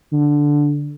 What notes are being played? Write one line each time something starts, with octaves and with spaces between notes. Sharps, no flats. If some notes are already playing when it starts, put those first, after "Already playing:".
D3